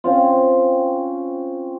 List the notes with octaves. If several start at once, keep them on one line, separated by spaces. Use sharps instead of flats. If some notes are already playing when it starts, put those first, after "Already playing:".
C4 C#4 F4